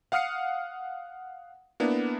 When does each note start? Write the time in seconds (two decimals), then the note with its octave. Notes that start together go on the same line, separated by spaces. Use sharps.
0.12 F5 F#5 D#6 F6 C7 C#7
1.80 A#3 B3 D4 E4